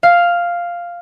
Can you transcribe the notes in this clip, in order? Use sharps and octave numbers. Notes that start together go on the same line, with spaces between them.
F5